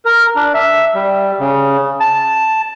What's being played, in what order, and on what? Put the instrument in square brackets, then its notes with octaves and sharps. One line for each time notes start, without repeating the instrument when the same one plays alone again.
[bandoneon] A#4
D4
E5
G3
C#3
A5